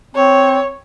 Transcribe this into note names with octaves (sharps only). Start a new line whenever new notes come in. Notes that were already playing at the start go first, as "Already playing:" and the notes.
C4 C#5